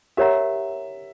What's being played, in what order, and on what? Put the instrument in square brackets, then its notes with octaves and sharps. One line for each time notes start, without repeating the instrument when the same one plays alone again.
[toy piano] G4 A#4 C#5 F#5 A#5 [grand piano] E5